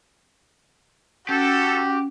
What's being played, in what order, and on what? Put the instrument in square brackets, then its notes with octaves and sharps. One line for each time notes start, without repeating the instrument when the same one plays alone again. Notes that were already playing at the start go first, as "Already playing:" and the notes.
[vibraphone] C#4 [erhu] F#4 [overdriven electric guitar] G4 [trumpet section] A4